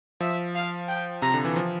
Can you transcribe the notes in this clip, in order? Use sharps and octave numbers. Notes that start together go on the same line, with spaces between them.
F3 E5
F5
G5
C3 A#5
D3
E3
F3